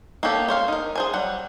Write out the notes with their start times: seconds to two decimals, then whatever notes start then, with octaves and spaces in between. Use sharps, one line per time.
0.23 A#3 B3 C#4 G4 A4
0.48 C5 C#5 F5
0.68 D#4 A#4
0.95 G#4 C5 G#5
1.13 F#3 G3 F#5